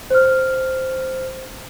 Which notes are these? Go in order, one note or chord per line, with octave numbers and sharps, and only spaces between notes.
C5 F6